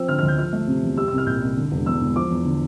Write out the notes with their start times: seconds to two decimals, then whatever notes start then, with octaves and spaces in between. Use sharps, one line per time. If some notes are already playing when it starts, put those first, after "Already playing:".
Already playing: F3 C4 E6
0.08 D3 F6
0.18 F6
0.23 D2
0.28 G6
0.38 F3 F6
0.53 A3
0.67 C3
0.83 E2
0.97 G3 E6
1.08 E6
1.12 C2
1.18 F6
1.27 A#2 G6
1.42 C2
1.57 D3
1.72 E1
1.86 E2 E6
2.01 E1
2.16 F3 D6
2.31 E2
2.45 D3